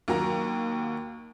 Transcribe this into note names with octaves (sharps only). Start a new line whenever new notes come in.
D#2 F#3 A#3 A#5